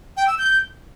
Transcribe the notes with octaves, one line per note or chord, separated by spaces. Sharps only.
G5
E6
G6